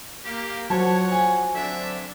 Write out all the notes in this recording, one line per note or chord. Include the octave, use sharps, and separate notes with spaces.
A#3 G4
F3 F#3 C5 C#5 F#5 A5 G#6
G#5
D3 C4 D4 E5